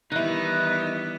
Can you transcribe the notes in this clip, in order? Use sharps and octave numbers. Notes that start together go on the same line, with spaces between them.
D#3 E3 G3 B3 D#4 E4 F#6